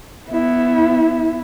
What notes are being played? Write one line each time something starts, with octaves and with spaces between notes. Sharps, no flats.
B3 E4